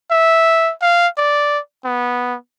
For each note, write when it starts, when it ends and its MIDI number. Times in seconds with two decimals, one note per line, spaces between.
0.11 0.72 76
0.82 1.08 77
1.18 1.59 74
1.85 2.35 59